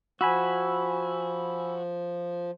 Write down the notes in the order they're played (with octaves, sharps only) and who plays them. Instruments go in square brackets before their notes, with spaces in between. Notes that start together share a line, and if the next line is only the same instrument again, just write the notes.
[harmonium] F3 [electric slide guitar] F#4 [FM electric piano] G#5 B5 E6